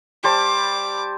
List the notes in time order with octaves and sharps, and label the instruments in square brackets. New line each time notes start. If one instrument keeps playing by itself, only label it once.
[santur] G3 C5 A5 [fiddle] D6